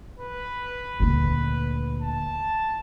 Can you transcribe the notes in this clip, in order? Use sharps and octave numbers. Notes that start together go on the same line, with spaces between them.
B4
D2 A#2
A5